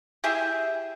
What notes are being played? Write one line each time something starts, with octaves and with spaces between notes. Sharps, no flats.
E4 G4 G#4 E5